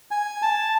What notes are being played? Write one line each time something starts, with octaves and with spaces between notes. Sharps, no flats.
G#5
A5